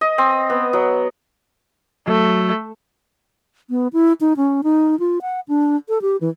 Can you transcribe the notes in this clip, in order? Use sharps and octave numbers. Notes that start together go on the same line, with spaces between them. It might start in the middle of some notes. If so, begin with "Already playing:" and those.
D#5
C4
B3
F#3
F#3 A3
B3
E4
D#4
C#4
D#4
F4
F#5
D4
A4
G4
E3